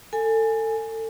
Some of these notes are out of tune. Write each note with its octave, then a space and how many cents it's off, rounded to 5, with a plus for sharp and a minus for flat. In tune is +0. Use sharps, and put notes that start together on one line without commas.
A4 +25 G#5 +0